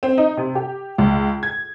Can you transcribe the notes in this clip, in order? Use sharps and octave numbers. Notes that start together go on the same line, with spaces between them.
C4
D#4
C3
G4
C#2
G#6